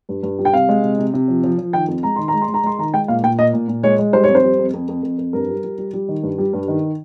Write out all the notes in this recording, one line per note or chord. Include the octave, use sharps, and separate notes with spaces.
G2
G2
G3
G5
C3 F5
G#3
C3
C3
C3
F3
F3
F3
D#3 G5
F2
G#3 A#5
D#3 C6
G#3 A#5
C6
G#3
A#5
G#3 C6
D#3 A#5
G#3 G5
A#2 F5
A#2 G5
A#2 D#5
A#2
A#2
G#3 C#5
G#3
G3 C5
F2 C#5
C5
G3
F2
F2
F2
F2
F2
G2 A#4
G3
G3
G3
G3
D#3
G2
G3
G2
D#3